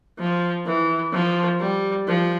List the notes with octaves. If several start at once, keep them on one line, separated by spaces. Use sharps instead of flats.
F3
E3
F3
G3
F3